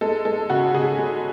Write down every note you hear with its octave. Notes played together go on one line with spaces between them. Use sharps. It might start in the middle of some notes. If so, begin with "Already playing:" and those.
G#3 A4
G#3 A4
C#3 F#4
C#3 G#4
G#3